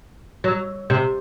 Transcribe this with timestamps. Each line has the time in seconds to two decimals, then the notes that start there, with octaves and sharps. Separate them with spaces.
0.44 F#3
0.90 C3